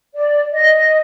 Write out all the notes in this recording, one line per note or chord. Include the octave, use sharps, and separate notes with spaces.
D5
D#5